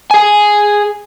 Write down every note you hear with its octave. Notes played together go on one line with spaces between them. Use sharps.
G#4 G#5